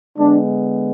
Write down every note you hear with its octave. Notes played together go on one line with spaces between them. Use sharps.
D3 G#3 B3 D4